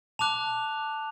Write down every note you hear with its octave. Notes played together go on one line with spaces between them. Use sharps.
A5 D6 F#6 F7